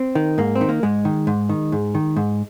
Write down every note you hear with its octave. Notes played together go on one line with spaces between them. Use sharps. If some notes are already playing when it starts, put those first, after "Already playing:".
Already playing: C4
D#3
G#2 A#3
C4
D#3
A#3
G#2 G#3
D#3
G#2
D#3
G#2
D#3
G#2